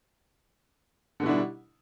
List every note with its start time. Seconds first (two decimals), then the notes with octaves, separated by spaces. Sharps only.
1.20 D3
1.23 B2
1.26 E4
1.29 D4
1.32 G3